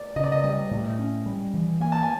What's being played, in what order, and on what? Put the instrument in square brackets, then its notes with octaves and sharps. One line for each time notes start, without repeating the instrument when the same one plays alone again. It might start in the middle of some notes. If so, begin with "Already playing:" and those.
Already playing: [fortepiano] D5
[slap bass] C#3 [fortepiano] D#5
[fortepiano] D5
D#5
[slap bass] G3 [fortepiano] D#5
[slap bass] A2
C#4
G3
E3
[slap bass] A#3 [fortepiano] G#5
[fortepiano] A5
G#5